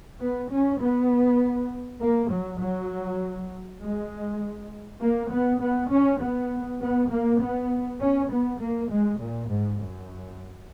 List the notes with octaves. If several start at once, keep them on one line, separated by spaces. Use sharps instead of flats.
B3
C#4
B3
A#3
F#3
F#3
G#3
A#3
B3
B3
C#4
B3
B3
A#3
B3
C#4
B3
A#3
G#3
A#2
G#2
F#2